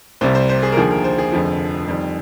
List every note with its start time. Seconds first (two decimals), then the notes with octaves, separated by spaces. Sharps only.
0.21 C2 C3 G3 C5
0.35 C5
0.49 C5
0.62 G#4
0.72 A#4
0.77 D#2 D3 F3 G#4
0.91 A#4
1.04 C5
1.18 G#4
1.32 F1 F2 D3 F3
1.88 F2 D#3 G3